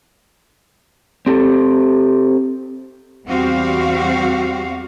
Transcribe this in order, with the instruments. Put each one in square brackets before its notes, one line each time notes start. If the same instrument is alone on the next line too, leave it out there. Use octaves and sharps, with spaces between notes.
[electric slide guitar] C4 G4 A4
[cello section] E2 G3 C4 F#4 G4 F5